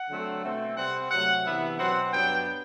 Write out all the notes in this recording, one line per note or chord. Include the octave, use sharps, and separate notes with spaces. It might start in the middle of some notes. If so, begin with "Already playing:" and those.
Already playing: F#5
D3 F#3 A3 C4
B2 A3 C4
C3 G3 C4 F#5
C3 F#3 A3 F#5
C3 E3 B3 D4 E5
B2 F#3 C4 F#5
G2 F#3 B3 D4 G5